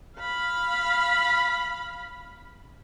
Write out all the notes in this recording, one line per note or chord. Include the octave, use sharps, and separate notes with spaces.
F5 B5